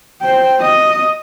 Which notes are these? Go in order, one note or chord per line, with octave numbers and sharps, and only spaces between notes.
C5 G5
D#5